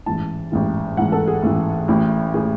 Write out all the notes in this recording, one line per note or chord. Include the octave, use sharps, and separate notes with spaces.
A1 G#2 E3 A5
A1 G#2 E3
A1 G#2 E3 F#5
A4
G#4
A1 G#2 E3
A1 A2 E3
A2 E3 G#4